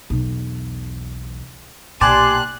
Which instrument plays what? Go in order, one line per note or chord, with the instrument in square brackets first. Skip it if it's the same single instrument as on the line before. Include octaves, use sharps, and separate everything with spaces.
[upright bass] B1 E2
[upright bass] B1 A#2 [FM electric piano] G4 D5 A5 [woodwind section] G#5 C6 [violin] F#6